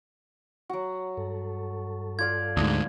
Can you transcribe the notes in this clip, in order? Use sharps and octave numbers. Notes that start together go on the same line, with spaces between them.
F#3 F#4
G2 A4
F4 D5 F5 G#6
D2 G#2